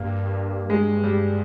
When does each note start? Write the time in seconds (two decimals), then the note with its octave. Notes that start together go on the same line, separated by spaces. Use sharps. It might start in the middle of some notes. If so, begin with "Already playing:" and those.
Already playing: G2 A#3
0.70 G2 G#3
1.04 G3